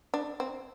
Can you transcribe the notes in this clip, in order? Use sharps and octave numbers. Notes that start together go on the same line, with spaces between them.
D4
C4